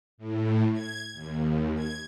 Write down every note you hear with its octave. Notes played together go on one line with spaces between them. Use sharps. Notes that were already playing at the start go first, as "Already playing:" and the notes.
A2
G#6
D#2
G#6